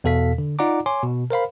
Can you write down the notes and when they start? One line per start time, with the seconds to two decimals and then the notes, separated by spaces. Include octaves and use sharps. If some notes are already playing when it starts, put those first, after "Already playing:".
0.04 E2 B2 A4 F5 B6
0.38 D3
0.59 D#4 F4 D5 F#5 A#5 D6
0.86 C#5 G#5 C6 D6
1.03 B2
1.30 A#4 C5 F5 B5